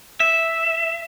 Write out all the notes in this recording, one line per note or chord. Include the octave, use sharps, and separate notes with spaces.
E5